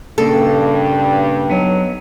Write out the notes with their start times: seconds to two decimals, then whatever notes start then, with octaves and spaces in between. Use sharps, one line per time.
0.18 G2 A#2 C#3 A#3 A4
1.49 F#3 B3 D#4